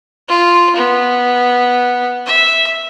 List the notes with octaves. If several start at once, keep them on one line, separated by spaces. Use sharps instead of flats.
F4
B3
E5